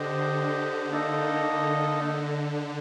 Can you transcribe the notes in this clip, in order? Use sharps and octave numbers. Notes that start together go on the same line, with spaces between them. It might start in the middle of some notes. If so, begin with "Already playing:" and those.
Already playing: D3 G4 C5 D#5
A#3 D#4 A4 D#5